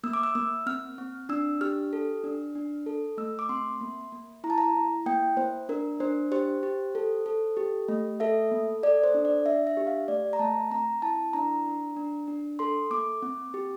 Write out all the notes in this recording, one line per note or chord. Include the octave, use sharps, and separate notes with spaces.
A#3 E6
D6
E6
A#3 E6
C4 F6
C4
D4 E6
G4 F6
A4
D4
D4
A4
A3 E6
D6
C4 C6
A#3
A#3
E4 A#5
A5
A#5
E4
A#3 G5
A#3 C5
D4 A#4
D4 C5
G4 C5
G4
A4
A4
G4
A3
A4 E5
A#3
A4 D5
C5
D4
D5
D4 E5
E5
G4
F5
A3 D5
A#5
A3 A5
C4 A#5
E4 A5
D4 A#5
D4
D4
D4
A4 C6
A#3 D6
C4
G4